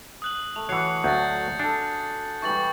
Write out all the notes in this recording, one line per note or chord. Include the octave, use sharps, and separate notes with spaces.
D#6 F#6 F#7
A3 F7
E3 F#4 C#5 F#6 C7 C#7
D2 F#3 G6 A6
D4 G#4 A4
E3 G3 G4 C#6 A6 F#7